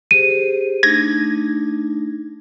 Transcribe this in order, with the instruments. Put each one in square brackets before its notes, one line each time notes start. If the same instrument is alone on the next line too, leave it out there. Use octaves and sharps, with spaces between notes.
[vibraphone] G4 G#4 C5 [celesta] D#7
[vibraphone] A3 D4 D#4 [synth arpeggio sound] G#6 A#6